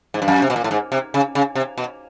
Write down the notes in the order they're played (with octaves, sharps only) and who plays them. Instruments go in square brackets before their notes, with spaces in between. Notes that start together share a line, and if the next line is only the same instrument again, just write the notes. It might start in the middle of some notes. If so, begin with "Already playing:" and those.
[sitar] G#2
G2
F#2
C3
B2
A#2
A2
G#2
C3
C#3
C#3
C3
B2